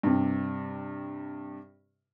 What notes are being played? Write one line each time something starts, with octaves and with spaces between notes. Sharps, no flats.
G2 C3